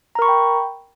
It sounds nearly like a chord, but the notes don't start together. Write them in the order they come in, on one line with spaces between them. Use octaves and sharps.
A#5 A#4 C#6 B5 G5